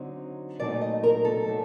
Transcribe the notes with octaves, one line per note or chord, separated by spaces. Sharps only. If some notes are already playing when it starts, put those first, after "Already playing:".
Already playing: D3 F#3 C4 D#4
A#2 F#3 A3 C4 D#4 D5
D#5
A#4
A4
A#2 F#3 A3